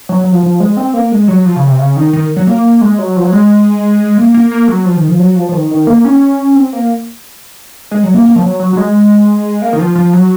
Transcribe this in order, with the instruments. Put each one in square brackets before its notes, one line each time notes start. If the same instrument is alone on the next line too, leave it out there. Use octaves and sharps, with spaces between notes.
[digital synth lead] F#3
F#3
F3
F3
G#3
C4
A#3
G#3
F#3
F3
C#3
C3
C#3
D#3
D#3
F#3
A#3
G#3
F#3
F3
F#3
G#3
A#3
A#3
A#3
F#3
F3
D#3
F3
F#3
F3
F3
D#3
D#3
A#3
C#4
C4
A#3
G#3
F#3
A#3
A#3
F3
F#3
F#3
F#3
G#3
A#3
D#3
F3
F3
F#3